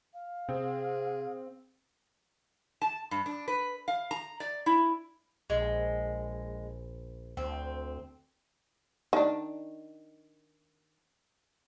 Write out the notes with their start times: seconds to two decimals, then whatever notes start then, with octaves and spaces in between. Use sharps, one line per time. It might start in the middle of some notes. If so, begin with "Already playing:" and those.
0.14 F5
0.49 C3 C4 G#4
2.82 A5
3.11 G2
3.26 D4
3.48 B4
3.88 F5
4.11 A#5
4.40 D5
4.66 E4
5.50 A#1 G#3
7.37 D2 C4
9.13 D#3 D4